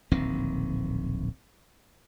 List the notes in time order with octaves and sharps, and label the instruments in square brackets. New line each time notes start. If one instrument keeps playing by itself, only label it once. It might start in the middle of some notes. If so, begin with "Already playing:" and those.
[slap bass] D1 A#1 D#3 C4